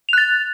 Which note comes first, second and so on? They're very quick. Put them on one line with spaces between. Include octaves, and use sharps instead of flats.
F7 F#6 A6